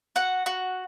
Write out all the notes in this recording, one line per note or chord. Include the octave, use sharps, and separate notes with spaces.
F#4 F#5
F#4